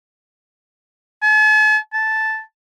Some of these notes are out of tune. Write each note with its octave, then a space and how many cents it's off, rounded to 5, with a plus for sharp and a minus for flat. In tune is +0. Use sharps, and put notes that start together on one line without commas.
A5 -45
A5 -5